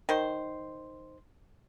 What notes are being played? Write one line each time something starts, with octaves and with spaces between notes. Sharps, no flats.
D#3 C5